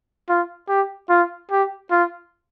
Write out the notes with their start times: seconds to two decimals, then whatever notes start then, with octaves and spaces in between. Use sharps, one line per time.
0.29 F4
0.69 G4
1.09 F4
1.51 G4
1.91 F4